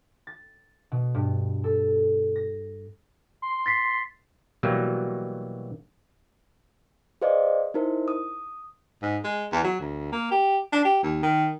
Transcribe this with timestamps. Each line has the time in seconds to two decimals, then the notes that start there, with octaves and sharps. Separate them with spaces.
0.27 A6
0.92 B2
1.15 G2
1.64 A4
2.36 A#6
3.42 C6
3.66 A6 B6 C7
4.63 B2 E3 F#3 G3 A#3
7.22 G#4 B4 C5 D5 D#5 F5
7.74 D#4 E4 A#4 C5
8.08 D#6
9.02 G#2
9.24 G#3
9.52 E2
9.64 F#3
9.80 D2
10.12 A#3
10.31 G4
10.73 D4
10.85 G4
11.03 D#2
11.23 D#3